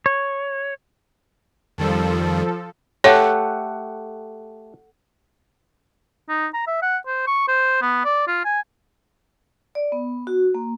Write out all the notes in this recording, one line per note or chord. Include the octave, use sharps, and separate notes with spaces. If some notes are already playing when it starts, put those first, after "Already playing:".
C#5
F2 D#3 F3 G3 A4
A3 G4 A4 C#5 F#5
D#4
A#5
E5
F#5
C5
C#6
C5
B3
D5
F4
G#5
D5
B3
F#4
A#3